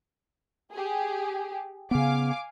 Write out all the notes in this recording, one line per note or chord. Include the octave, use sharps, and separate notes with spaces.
G4 G#4
C#3 B3 F5 G#5 D6